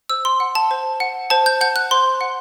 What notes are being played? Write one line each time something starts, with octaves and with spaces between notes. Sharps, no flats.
C5 E6
C6
F#5
A5
C5
F#5
C5 A5
G6
F#5 G6
F#6
C5 C6
F#5